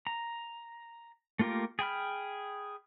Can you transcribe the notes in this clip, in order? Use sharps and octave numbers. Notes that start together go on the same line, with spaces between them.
A#5
A3 A#3 F4 G4 A#4
G#4 G5 B5 F6